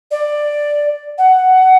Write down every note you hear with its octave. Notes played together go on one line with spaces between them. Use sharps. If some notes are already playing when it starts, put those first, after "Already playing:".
D5
F#5